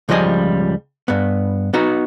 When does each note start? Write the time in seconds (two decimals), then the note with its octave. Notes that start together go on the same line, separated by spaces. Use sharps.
0.09 C#2 F3 G3 D#5 G#5
1.08 G2 B3
1.73 B3 D#4 F#4